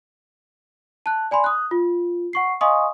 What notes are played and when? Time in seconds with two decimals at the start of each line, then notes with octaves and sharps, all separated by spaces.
1.06 A5 F#6
1.31 D5 G#5 B5 C6
1.44 D#6 F#6
1.71 F4
2.33 F#5 C#6 C7
2.61 D#5 F5 G#5 C6 C#6 D#6